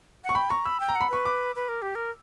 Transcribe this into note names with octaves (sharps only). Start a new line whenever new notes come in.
F#5
C#6
G5 B5
A#5 C#6
B5 E6
G5
A#5
F#5
B5
B4 C#6
D6
B4
A#4
G4
A#4